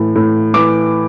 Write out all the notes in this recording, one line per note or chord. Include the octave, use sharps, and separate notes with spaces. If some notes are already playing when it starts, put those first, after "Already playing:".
Already playing: A2 E3
A2
E3 D6